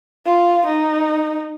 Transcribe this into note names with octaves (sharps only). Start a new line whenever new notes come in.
F4
D#4